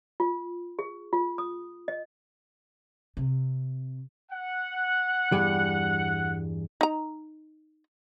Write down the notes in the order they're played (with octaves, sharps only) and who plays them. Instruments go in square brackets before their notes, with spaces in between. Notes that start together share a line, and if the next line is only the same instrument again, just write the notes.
[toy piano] F4
G#4
F4
D#6
D#5
[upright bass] C3
[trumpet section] F#5
[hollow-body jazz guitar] E2 G2 G3
[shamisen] D#4 A#5